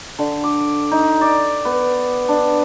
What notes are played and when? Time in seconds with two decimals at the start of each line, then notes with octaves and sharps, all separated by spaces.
0.19 D3
0.44 D6
0.91 D#4
1.21 D5
1.65 B3
2.29 D4